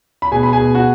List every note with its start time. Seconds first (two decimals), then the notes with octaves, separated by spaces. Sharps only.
0.22 B5
0.31 B2 G#4 G#5
0.43 B5
0.53 G#4 G#5
0.61 B2
0.75 F#4 F#5